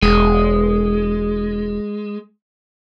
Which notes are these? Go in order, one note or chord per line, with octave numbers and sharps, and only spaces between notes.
E1 G#3